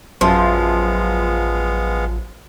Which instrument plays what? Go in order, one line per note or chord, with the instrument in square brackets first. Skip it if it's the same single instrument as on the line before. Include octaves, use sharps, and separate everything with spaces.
[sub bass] A1 [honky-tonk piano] F#2 [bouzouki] F3 [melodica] G#3 B3 F5